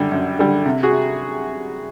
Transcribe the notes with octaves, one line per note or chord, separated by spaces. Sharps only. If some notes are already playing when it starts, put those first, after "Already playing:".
Already playing: F#2 D3 G3
F#2
D3 G3
C3
F#4 G#4